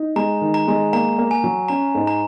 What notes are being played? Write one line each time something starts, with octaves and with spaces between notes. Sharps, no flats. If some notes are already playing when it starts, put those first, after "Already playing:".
Already playing: D#4
G#3 A#5
D#3
A#5
G#3
A#3 A#5
A#3
G#5
F#3
C#4 A#5
G#2
A#5